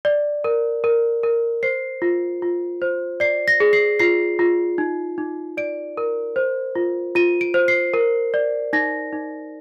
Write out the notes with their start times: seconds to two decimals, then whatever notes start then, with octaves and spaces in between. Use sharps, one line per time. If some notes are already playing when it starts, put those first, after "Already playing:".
0.05 D5
0.44 A#4
0.84 A#4
1.23 A#4
1.63 C5 C7
2.02 F4
2.42 F4
2.82 C5
3.20 D5 C7
3.48 A#6
3.60 G#4
3.73 C7
3.99 F4 C7
4.39 F4
4.78 D#4
5.18 D#4
5.57 D5 D7
5.97 A#4
6.36 C5
6.75 F4
7.15 F4 D#7
7.41 D7
7.54 C5
7.68 C7
7.94 A#4
8.34 D5
8.73 D#4 A#6
9.13 D#4